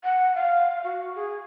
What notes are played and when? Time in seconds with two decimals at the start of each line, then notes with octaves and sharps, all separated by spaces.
0.04 F#5
0.35 F5
0.84 F#4
1.15 G#4